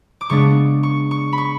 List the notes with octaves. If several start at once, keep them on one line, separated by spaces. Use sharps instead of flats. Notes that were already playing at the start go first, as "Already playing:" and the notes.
D6
C#3 G#3 B3 D4 C#6
C#6
C#6
B5
C#6